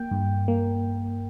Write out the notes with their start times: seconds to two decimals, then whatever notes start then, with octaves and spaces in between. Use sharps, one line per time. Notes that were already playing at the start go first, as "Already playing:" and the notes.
Already playing: A#3 G5
0.11 G2
0.48 A#3